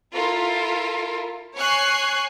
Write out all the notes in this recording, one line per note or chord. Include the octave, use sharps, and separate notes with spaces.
E4 F4 A4 A#4
C#5 G#5 C#6 F#6 C7